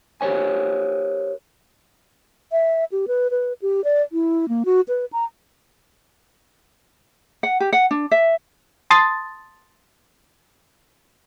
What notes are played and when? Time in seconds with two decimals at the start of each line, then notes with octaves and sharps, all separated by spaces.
0.21 G4 A#4 C5 C#5 G#5
2.52 E5
2.92 G4
3.08 B4
3.31 B4
3.62 G4
3.84 D5
4.13 E4
4.49 A#3
4.65 F#4
4.88 B4
5.13 A#5
7.43 F#5
7.60 G4
7.73 F#5
7.91 D4
8.11 E5
8.90 A5 C6 D#6 A6